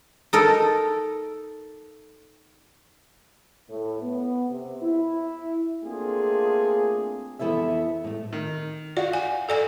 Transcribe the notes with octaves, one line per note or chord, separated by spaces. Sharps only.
D#4 A4 A#4
A2
B3
C3
E4
A3 A#3 C4 D4 F4 G#4
F2 E3 B3 E4 A4 E5
A2 A3
D#3
F#4 D5 F5
G#5
A4 D5 G#5